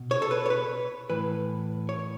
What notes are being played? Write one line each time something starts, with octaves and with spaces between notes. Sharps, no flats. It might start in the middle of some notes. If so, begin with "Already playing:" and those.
Already playing: B2
C#5
A4
B4
C#5
B4
A2 E3 B4
C#5